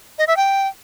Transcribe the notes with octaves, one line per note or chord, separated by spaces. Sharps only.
D#5
E5
G5